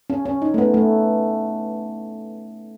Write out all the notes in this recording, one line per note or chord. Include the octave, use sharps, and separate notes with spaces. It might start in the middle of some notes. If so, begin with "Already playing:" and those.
C#4
C#4
D#4
A3
B3
A3